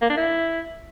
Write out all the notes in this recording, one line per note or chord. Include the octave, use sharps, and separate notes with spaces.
A#3
D4
E4